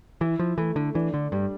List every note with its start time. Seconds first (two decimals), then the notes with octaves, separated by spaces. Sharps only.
0.21 E3 E4
0.39 F3
0.58 E3 A3
0.76 D3
0.94 E3 D4
1.14 D3
1.32 G2 G3